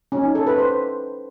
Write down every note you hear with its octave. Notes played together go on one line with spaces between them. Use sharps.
C#4
D#4
A4
B4
C5